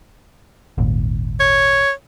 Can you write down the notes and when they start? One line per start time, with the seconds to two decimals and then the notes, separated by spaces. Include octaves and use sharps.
0.78 D#1 G#1 D#2
1.40 C#5